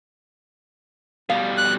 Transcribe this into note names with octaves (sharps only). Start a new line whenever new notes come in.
B2 G3 F5
F#6